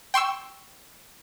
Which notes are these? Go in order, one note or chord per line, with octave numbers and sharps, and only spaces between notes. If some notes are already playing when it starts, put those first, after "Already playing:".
G5 C6 C#6 E6